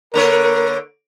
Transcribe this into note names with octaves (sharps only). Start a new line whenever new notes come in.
D3 A#3 A#4 C#5